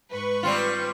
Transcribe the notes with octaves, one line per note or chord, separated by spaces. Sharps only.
G#2 B4 C#6
G3 C4 F4